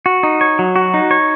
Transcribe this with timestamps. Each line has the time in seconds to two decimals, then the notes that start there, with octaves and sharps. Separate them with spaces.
0.06 F#4
0.23 D#4
0.41 C#5
0.59 F#3
0.76 F#4
0.94 D#4
1.11 C#5